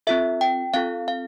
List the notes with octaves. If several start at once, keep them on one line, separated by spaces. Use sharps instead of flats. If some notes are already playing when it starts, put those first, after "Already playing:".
C4 F4 A4 E5
G5
C4 F4 A4 F5
F5